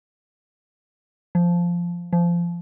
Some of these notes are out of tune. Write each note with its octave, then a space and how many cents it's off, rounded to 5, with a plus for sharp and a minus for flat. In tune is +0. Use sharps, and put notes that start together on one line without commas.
F3 -5
F3 -20